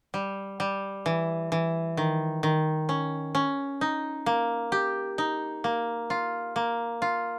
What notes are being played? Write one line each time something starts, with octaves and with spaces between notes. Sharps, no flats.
G3
G3
E3
E3
D#3
D#3
C#4
C#4
D#4
A#3
G4
D#4
A#3
F4
A#3
F4